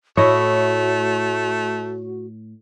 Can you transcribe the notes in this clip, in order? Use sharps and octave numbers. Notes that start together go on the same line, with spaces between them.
A2 A3 E4 F#4 C#5 D#5